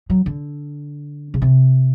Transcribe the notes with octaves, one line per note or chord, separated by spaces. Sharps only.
F#3
D3
C#3
C3